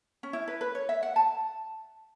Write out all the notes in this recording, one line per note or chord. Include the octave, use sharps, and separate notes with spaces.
C#4
E4
B4
B4
C#5
E5
F#5
A5